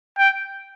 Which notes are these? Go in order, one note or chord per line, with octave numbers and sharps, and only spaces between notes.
G5